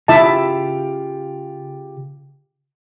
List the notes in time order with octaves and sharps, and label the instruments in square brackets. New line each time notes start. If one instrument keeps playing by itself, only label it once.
[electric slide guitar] C#3 F4 G4 [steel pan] E4 E5 A5